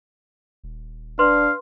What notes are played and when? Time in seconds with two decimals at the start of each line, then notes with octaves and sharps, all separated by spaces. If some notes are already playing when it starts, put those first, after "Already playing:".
0.64 D#1
1.19 D4 B4 F5 C6